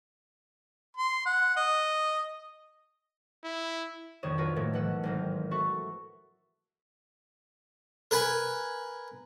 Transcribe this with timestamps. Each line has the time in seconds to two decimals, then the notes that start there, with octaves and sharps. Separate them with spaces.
0.97 C6
1.26 F#5
1.57 D#5
3.44 E4
4.23 A#1 F2 D#3 C#5 D#6 E7
4.38 D4 F4 F#4 A#4 B4 C#5
4.56 A2 D#3 F3 A3 A#3
4.73 B1 E3 F#5 E6
5.03 G#1 C4 A#4
5.51 F#4 A4 E5 C#6
8.11 A#4 B4 G#5 B5